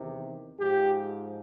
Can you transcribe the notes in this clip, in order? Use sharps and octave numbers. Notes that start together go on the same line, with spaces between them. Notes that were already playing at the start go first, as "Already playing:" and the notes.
Already playing: E2 C3 D#3
G#2 F3 G4